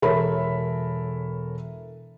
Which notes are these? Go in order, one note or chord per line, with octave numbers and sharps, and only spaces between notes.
E1 A4 A#4 C#5 E5 B5